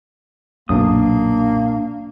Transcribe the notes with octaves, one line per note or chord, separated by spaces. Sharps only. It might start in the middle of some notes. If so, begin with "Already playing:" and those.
B1 F#2 A#2 A#3 D4 D#6